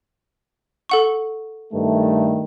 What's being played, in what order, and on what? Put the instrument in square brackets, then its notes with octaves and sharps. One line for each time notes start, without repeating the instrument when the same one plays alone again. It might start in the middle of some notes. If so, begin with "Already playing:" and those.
[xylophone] A4 F#5 C#6
[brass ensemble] G2 D#3 A3